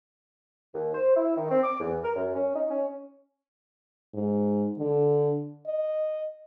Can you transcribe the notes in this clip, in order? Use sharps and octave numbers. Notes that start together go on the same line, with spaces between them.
D#2
C5
E4
D#3
C4
D6
E2
A#4
F#2
C#4
D#4
C#4
G#2
D3
D#5